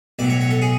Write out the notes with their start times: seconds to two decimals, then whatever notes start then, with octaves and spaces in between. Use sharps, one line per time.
0.19 B1 A2 F#3 D5
0.30 C#5
0.41 C#5
0.51 A4
0.62 G#4